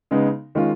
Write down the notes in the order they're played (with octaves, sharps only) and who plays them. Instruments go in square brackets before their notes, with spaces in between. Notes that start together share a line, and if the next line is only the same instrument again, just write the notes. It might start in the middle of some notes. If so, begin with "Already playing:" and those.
[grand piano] C#3 G#3 B3 D#4
D#3 G#3 C#4 F4